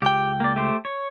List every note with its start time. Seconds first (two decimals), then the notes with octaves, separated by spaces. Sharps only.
0.02 C#2 G4 G5
0.40 A#3 D5
0.56 A3 G4 C5
0.85 C#5